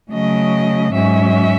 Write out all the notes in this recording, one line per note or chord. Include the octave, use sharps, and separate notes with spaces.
C#3 F#3 A3 D#5
G#2 F#3 C#4 E5